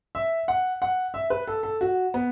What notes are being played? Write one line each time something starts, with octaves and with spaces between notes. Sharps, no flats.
E5
F#5
F#5
E5
B4
A4
A4
F#4
B3